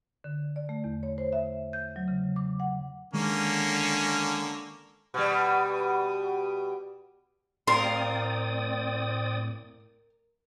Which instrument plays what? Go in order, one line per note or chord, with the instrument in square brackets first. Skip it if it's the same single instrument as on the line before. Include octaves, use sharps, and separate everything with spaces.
[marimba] D3
D5
A3
E2
C#5
C5
E5
G6
F#3
C#3
D6
F#5
[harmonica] D3 A#3 C#4 [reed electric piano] D#3 G#3
[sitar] B2 G3
[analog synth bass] A2 [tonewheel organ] C4 D5 D#6 [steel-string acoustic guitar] A#4 [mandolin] F5 C6